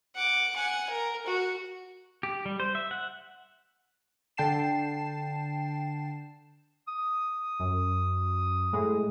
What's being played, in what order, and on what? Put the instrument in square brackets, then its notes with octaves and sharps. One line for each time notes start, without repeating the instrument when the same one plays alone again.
[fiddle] F#5 D6
F#5 G#5
A#4
F#4
[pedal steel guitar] G4
G3
C5
E5
F#5
[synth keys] D3 G5 A5 C7 E7
[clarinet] D#6
[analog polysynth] F#2
A2 G#3